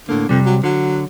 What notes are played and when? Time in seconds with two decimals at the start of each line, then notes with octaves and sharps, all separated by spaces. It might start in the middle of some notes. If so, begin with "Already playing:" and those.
0.09 A2 D3 A#3
0.29 F2 C3 G3
0.45 F#3
0.64 D3 F#3